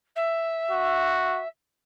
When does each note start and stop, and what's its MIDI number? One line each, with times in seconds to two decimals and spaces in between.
0.16 1.48 76
0.71 1.41 66